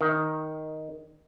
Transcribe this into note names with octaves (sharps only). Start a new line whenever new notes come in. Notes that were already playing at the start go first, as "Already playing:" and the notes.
D#3